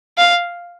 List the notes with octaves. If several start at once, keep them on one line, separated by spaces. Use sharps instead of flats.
F5